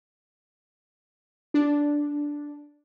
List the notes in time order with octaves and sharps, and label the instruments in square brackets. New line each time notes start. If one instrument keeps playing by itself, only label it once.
[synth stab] D4